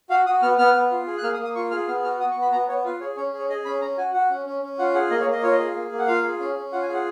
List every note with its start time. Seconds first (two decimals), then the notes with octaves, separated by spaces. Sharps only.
0.10 F#4 F5
0.26 F#4 D#6
0.42 B3 F6
0.58 B3 F6
0.74 B3
0.91 F4
1.07 G#4
1.18 F#6
1.23 A#3 F6
1.34 D#6
1.39 A#3
1.44 D#6
1.55 F4 C#6
1.71 G#4 F6
1.88 B3 F6
2.04 F#4 F6
2.20 F#4 D#6
2.31 C#6
2.36 B3
2.42 B5
2.52 B3 A#5
2.68 B3 C#5
2.84 F4 B4
3.00 G#4 C#5
3.16 C#4 C#5
3.33 G#4
3.39 C#5
3.49 G#4 D#5
3.65 C#4 B5
3.81 C#4 A#5
3.97 F#4 G#5
4.14 F#4 F#5
4.30 C#4
4.46 C#4
4.62 C#4
4.79 F4 F#5
4.94 G#4 F#5
5.10 A#3 D#5
5.21 C#5
5.27 A#3
5.32 D#5
5.42 F4 C#5
5.52 D#5
5.59 G#4
5.75 A#3
5.92 A#3
5.98 F#5
6.07 F4 F5
6.23 G#4
6.39 C#4
6.56 C#4
6.72 F4 F#5
6.83 G#5
6.89 G#4 F#5